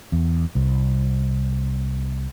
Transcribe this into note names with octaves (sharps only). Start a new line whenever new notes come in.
E2
C2